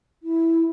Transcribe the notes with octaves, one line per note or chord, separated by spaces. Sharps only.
E4